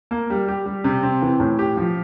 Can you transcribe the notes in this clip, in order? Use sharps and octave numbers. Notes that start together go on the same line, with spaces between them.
A#3
G3
G4
G3
C3
C4
E3
A2
G4
F3